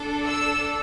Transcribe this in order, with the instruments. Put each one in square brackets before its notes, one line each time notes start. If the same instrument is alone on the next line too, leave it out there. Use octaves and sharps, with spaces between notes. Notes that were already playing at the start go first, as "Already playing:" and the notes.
Already playing: [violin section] D4 A4
E6